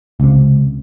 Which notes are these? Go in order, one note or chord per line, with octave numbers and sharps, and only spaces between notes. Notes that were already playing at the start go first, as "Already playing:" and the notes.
C#2 C3